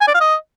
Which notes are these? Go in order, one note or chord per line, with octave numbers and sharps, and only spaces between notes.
G#5
D5
F5
D#5